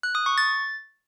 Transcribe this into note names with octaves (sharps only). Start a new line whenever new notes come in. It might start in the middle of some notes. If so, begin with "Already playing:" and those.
F#6
D#6
C#6
A6